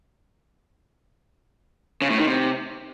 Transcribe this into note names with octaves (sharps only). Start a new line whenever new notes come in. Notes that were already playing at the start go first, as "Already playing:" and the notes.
C#3
A2
D#3
C3